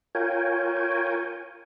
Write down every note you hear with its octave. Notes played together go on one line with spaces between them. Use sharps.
F4 A#4 C#5 G5 G#5